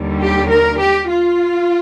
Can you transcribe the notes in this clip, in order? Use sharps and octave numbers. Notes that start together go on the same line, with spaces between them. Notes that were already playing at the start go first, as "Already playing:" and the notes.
Already playing: D#2 D3 G3
G4
A#4
G4
F4